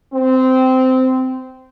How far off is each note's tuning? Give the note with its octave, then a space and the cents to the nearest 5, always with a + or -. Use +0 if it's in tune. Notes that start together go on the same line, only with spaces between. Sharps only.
C4 -15